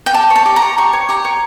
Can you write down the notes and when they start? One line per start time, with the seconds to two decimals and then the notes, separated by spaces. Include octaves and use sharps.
0.06 G5
0.14 G4 A5
0.30 C#5
0.36 A5
0.46 G4
0.56 A#5
0.62 C#5
0.78 G4 C#6
0.93 C#5
1.09 G4 A#5
1.25 C#5